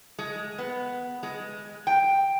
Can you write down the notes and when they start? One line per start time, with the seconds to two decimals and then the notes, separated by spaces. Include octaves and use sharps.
0.19 G#3
0.59 B3
1.23 G#3
1.87 G5